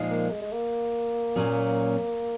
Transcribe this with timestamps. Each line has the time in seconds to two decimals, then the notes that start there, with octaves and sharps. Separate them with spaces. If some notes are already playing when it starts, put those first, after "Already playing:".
Already playing: A#2 F3 G#3 D#4
0.10 A#3
0.31 G#3
0.42 G#3
0.52 A#3
1.36 A#2 F#3 C#4 G#4